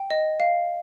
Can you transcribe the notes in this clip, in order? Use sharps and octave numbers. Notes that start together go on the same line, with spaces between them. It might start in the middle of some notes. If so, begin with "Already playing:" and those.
Already playing: G5
D#5
F5